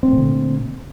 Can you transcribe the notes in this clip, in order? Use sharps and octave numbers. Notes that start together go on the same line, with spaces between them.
A#2 D3 A3 C4